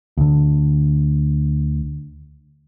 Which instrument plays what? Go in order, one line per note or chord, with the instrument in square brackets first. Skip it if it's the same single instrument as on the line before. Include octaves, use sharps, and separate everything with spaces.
[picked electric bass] D2 D3